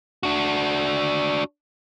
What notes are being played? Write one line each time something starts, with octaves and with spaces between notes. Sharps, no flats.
D4 F#4